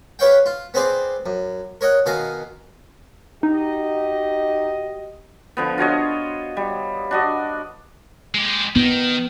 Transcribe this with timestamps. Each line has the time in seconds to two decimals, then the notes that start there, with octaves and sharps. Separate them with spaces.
0.19 G4 B4 C#5 F5 G5
0.46 F4
0.74 B3 C4 G#4 C5 D5
1.26 F#2
1.81 A#4 C#5 D#5 F#5
2.06 B2 D#3 F5 G#5 A#5
3.43 D#4 F#4 G4 D#5
5.57 D3 F3 B3
5.78 F4 F#4 C#5 D#5
6.57 G3
7.11 D4 F#4 D#5
8.35 G#3 G4
8.76 D#3 B3